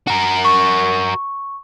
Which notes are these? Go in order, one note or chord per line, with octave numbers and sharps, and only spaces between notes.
F#4 A#4
C#6